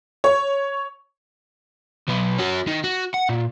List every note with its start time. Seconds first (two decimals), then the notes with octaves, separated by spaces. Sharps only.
0.24 C#5
2.08 B1 B3
2.38 C#4 F#4
2.68 D#3
2.84 F#4
3.14 F#5
3.29 A#2